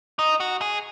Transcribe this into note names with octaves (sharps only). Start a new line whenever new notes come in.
D#4
F#4
G#4